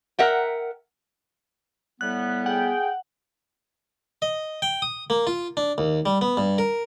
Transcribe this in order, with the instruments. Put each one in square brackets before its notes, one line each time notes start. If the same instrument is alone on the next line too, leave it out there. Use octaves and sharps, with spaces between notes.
[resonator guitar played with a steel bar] A#4 E5 F#5 G5
[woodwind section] A2 G3 B3 [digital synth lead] F#6
[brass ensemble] G#4 G5 [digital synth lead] F#5
[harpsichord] D#5
G5
D#6
A#3
F4
D4
D#2
G3
B3
G2
A#4